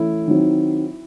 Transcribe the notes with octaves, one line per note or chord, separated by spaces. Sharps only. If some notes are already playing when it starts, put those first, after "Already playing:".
Already playing: E3 A3 C#4 E4
D#3 F#3 C4